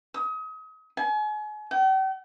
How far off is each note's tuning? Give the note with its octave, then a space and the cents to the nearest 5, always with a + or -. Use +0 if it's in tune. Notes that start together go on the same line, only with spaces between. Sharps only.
D#6 +35
G#5 +35
G5 -45